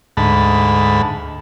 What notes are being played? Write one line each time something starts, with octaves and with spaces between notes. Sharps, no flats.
D2 G#2 A5 B5